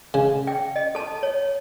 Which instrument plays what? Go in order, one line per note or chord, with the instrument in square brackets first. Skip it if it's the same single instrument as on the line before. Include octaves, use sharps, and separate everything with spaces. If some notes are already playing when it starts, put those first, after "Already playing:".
[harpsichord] C#3
[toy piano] G5
D#5
A4 A5
C#5